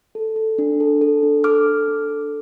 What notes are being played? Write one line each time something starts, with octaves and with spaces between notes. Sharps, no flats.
A4
A4
D4
A4
A4
D4
A4 D6 F6
A4
D4
A4